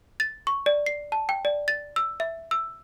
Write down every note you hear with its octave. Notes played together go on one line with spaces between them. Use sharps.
A6
C#6
D5
C7
A5
G5
D5
A6
E6
E5
E6